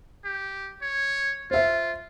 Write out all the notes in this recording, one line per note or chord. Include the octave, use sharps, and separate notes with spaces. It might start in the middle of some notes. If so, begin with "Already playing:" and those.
G4
C#5
F4 C5 E5